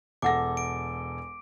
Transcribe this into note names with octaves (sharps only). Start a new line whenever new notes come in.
E1 A4 F#5 G#5 D6 A#6
D7